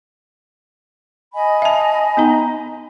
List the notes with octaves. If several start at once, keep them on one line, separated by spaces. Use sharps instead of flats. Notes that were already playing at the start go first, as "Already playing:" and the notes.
D#5 G#5 B5
E5 A5
B3 D#4 A#5